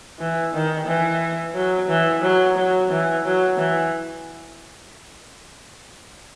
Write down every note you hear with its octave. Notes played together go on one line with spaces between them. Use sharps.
E3
D#3
E3
F#3
E3
F#3
F#3
E3
F#3
E3